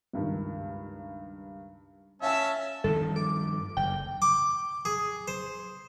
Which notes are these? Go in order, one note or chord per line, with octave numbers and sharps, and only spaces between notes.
C#2 G2 D#3
C#4 E5 F5 G#5 A5
G2 D#3 F3 A4
D6
F#1 G5
D6
G#4
C5